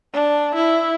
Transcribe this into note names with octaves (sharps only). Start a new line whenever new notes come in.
D4
E4